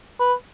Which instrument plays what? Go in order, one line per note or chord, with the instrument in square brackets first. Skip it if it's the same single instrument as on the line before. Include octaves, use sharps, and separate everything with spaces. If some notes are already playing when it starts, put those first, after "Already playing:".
[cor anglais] B4